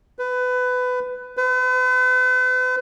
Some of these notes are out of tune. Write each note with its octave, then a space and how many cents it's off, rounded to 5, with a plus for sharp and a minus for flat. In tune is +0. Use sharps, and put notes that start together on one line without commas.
B4 +20
B4 +45